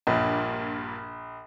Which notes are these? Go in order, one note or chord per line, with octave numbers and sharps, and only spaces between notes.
A#1 G2 A#2 A#4